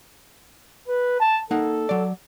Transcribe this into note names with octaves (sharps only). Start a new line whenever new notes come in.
B4
A5
A#3 D#4 A4 F#5
F#3 D5